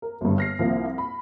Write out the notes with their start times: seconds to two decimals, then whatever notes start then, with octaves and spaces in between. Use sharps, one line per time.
0.02 A#4
0.21 G1 G2
0.38 F6 A#6 C7
0.59 C2 F3 A#3
0.98 B5